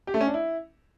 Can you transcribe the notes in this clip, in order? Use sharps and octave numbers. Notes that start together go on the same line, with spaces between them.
G4
A3
C#4
D4
E4